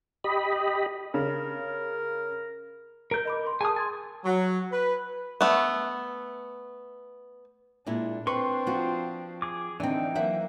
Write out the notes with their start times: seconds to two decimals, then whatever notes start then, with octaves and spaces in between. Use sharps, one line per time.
0.24 G4 D#5 B5
1.14 C#3 A#4
3.11 A#4 A#5 G6
3.25 D#5 B5 D6
3.47 C6
3.61 G#4 A#4 G#5 A5 D#6
3.76 G#5 C6 G#6 A6
4.24 F#3
4.71 B4
5.41 A3 B3
7.86 A#2 G#3 D4 E4
8.27 C4 D4 B4 C6 C#6
8.67 F3 F4 F#4
9.42 G#4 D6
9.80 D3 E3 C4 D4 D#4 G5
10.15 F#3 A#3 C5 E5 F#5